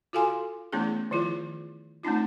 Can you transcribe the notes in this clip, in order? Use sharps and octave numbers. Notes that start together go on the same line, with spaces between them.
F4 F#4 A4 F5 G#5 C6
E3 A3 B3 C#4 E4 G#4
D#3 F3 E4 F4 G#4
A3 C4 C#4 D#4 F4